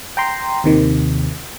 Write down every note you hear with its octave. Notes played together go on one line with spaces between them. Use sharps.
G5 A#5 C6
D#2 C3 D#3